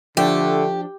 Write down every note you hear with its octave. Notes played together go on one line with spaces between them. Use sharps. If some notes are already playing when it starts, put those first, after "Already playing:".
D3 F3 A3 D4 G4